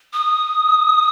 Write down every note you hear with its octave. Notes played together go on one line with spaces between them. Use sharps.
D#6